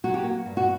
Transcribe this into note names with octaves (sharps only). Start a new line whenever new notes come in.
F#3 F#4
G4
A#3 F#4
G2
F#4